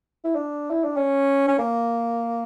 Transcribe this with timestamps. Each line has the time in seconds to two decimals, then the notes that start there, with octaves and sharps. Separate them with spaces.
0.25 E4
0.35 D4
0.71 E4
0.84 D4
0.96 C#4
1.48 C#4
1.59 A#3